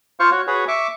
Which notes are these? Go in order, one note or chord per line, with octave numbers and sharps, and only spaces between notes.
F4 C5 F5 C#6
F#4 C#5
F#4 G#4 B4 C#5
E5 C#6 D6